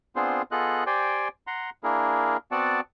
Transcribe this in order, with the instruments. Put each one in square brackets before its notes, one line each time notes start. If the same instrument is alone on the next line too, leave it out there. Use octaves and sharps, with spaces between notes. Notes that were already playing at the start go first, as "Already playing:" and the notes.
[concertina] B3 C4 D4 F4 G#4 C5
B3 F4 G#4 A4 D#5 F#6
G4 C5 D5 G5 G#5
F#5 A#5 C6
A#3 D4 E4 G#4 A#4
B3 C4 F#4 D5 F#5 A5